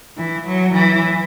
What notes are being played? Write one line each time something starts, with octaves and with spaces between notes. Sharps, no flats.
E3
F#3
E3